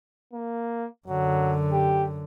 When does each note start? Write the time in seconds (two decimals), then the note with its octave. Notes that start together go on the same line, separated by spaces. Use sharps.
0.33 A#3
1.08 F#2 D3 F#3
1.72 G4